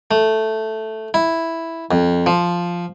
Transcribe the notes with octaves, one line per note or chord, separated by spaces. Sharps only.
A3
E4
F2
F3